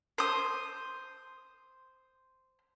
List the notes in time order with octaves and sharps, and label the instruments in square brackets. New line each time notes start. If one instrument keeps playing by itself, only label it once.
[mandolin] C5 D#6